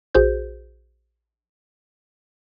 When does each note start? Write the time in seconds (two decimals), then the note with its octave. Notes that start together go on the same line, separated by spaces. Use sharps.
0.14 A#1 F#4 G#4 C5 G6